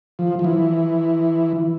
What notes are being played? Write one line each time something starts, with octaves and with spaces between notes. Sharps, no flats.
F3
F3
E3